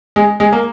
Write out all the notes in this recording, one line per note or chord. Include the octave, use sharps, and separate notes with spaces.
G#3
G#3
A#3